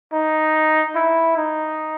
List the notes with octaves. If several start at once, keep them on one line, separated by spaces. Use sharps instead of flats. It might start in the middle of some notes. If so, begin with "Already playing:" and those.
D#4
E4
D#4